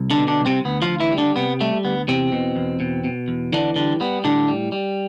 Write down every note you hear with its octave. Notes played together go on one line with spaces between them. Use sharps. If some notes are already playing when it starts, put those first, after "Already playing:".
Already playing: C2
D3 D4
B2
D3 D4
C2
C3 C4
D2 B3
F3 F4
D2
E3 E4
G3
D3 D4
C3 B3
G3 A3
D2 B3
E2 C3 C4
B2
E2
B2
B2
E2
D3 E3 D4
D3 G3 D4
G3 B3
A2 D3 D4
G3
G3